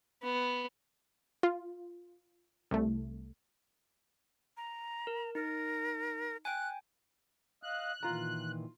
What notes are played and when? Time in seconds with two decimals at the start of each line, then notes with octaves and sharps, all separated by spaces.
0.23 B3
1.43 F4
2.71 C2 A3
4.57 A#5
5.07 A#4
5.35 D#4 A#4
6.45 G5 G#5 F#6
7.63 D#5 F5 F#6
8.03 A#2 D#3 E3 F4 A#5